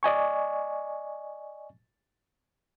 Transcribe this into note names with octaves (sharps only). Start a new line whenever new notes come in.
D5 D#5 G#5 C#6